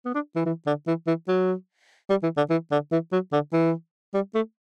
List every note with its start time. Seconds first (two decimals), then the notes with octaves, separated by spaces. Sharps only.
0.05 B3
0.15 D4
0.36 E3
0.46 E3
0.67 D3
0.87 E3
1.07 E3
1.28 F#3
2.10 G3
2.23 E3
2.37 D3
2.50 E3
2.71 D3
2.92 E3
3.12 F#3
3.32 D3
3.53 E3
4.14 G3
4.35 A3